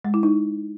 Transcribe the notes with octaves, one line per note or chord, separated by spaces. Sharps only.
G#3
E4
D#4